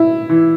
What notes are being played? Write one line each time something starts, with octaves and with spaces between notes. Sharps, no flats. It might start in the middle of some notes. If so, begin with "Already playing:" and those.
Already playing: E4
E3